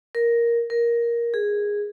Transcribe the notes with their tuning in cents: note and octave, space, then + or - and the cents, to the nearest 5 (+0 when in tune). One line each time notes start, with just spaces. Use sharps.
A#4 +5
A#4 +10
G#4 -10